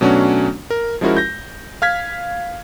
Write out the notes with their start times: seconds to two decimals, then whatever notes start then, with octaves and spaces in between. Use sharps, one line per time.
0.01 B2 F#3 A3 C#4 D4 F#4
0.70 A#4
1.01 F3 G#3 C#4 E4 F#4 A#4
1.17 G6 A#6
1.82 F5 F6 G#6 B6